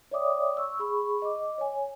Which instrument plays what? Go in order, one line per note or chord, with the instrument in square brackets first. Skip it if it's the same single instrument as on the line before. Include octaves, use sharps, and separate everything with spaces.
[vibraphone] C#5 D5 E5 G5 D6 D#6
C#6 E6
G#4 B5 C#6
D#5 D6
C#5 G#5